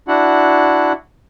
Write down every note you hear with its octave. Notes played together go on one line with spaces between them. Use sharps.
D4 E4 F#4 F#5